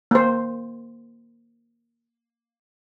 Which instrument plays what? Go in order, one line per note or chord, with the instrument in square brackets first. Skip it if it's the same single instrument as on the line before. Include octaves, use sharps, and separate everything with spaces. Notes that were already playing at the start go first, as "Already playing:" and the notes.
[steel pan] A#3 C5